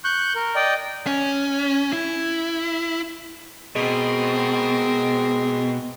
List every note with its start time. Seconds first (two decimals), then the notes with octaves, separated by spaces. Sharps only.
0.04 C#6 F#6 G6
0.35 A#4
0.55 D5 D#5 G5
1.07 C#4
1.93 E4
3.76 B2 G#3 C4 A#4